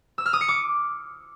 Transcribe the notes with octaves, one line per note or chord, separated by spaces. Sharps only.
E6
F6
D#6
C#7
D6